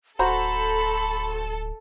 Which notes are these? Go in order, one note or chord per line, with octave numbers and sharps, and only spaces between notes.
D1 F#4 A4 C5 A#5 B5